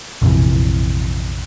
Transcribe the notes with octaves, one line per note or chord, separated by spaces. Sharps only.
A#1 F2 C3 E3